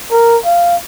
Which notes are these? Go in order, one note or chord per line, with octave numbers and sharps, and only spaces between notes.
A#4
F5